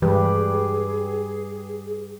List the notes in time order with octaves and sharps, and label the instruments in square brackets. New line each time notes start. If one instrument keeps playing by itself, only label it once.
[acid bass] G2 [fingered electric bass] E3 G#3 [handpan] G3 G4 B4 [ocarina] G#4